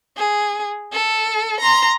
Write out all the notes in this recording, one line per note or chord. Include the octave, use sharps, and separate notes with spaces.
G#4
A4
A#5 C6